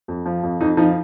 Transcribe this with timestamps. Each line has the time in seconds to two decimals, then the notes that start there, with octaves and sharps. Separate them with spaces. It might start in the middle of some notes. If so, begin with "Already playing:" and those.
0.08 F2
0.26 F3
0.43 F2
0.61 F2 D#4
0.77 F3 D#4